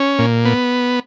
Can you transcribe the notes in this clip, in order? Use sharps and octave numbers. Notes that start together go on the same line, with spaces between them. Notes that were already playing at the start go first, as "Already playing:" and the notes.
Already playing: C#4
A#2
B3